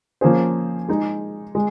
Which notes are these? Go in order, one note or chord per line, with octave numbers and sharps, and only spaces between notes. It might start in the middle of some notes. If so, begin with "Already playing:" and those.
F3 A#3 C#4 G#4 C5
G#3 D#4 G#4
G#3